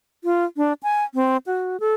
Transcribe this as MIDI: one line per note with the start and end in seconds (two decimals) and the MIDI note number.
0.24 0.44 65
0.57 0.73 62
0.83 1.04 80
1.15 1.37 60
1.47 1.80 66
1.80 1.95 69